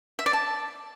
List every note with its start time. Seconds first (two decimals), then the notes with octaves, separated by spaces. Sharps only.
0.19 E5
0.26 D5
0.33 A5